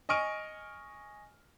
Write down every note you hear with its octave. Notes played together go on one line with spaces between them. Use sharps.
D#5 G#5 C#6 F6 D7 D#7